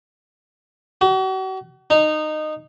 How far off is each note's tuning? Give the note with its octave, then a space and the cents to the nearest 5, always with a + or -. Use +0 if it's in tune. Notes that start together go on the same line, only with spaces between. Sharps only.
F#4 +40
D#4 -15